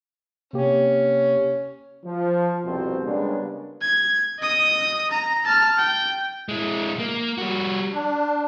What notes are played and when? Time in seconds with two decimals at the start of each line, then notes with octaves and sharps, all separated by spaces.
0.53 C3 A#3 C#4 G4
2.04 F3
2.64 C2 F2 B2 C4 C5
3.04 C#3 G3 G#3 A#3 B3 D4
3.81 G#6
4.39 D#5 D#6
5.11 A#5
5.45 A5 F6
5.77 G5
6.49 G#3 E4
7.00 A#3
7.38 G3 F#4
7.92 D4